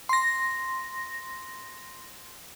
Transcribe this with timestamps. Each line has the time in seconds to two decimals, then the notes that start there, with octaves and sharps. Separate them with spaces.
0.09 C6 A#6